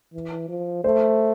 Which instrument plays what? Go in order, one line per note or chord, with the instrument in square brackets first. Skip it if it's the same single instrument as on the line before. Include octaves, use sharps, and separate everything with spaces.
[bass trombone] E3
F3
[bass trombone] A3 [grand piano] C5